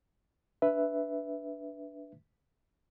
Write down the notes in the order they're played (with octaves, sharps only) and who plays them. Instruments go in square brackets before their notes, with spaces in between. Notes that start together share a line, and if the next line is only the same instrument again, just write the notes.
[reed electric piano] D4 B4 E5